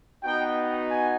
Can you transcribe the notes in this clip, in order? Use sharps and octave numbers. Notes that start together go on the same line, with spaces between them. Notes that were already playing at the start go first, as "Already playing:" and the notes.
B3 D#4 F#4 G5
G#5